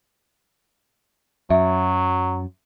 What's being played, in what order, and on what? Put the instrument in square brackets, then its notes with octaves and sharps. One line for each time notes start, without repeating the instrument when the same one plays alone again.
[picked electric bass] F#2 [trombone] F#3 [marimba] E5